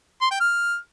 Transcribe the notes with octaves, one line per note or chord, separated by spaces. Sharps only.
C6
G5
F6